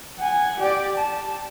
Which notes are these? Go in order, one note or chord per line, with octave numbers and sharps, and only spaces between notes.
F#5 G#5
G4 D5
A5